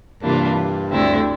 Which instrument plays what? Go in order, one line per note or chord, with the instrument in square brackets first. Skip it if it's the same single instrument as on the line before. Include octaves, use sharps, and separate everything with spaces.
[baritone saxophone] G2 [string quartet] C3 E3 A#3 D4 F4
[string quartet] D2 D3 A3 C4 E4